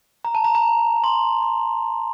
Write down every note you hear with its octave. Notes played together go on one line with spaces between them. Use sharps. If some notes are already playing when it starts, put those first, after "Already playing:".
A#5
A5
A#5
A#5
C6
C6